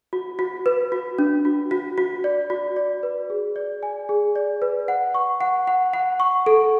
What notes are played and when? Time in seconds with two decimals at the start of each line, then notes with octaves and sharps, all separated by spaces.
0.13 F#4
0.39 F#4
0.66 B4
0.92 F#4
1.19 D4
1.45 F#4
1.71 F#4
1.98 F#4
2.24 D5
2.50 F#4
2.76 D5
3.03 B4
3.30 G#4
3.56 D5
3.83 G#5
4.09 G#4
4.36 D5
4.62 B4
4.88 F#5
5.14 C#6
5.41 F#5
5.67 F#5
5.94 F#5
6.20 C#6
6.46 A4